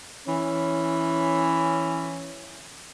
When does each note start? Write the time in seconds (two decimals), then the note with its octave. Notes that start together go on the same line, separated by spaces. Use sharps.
0.26 E3 C#4